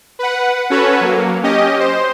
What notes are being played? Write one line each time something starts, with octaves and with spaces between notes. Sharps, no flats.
B4 F#5
C#4 F#4 A4 B4 C#5
F#3 A#3
C#4 G4 D#5
C5